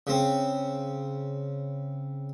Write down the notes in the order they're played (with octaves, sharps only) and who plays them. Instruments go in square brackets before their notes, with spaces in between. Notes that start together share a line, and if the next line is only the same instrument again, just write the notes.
[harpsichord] C#3 C4